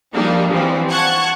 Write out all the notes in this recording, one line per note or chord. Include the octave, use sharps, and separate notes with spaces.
F3 G3 A#3 D4 D#4
E3 F3 G3 C4
F#5 A5 C#6 F#6 G#6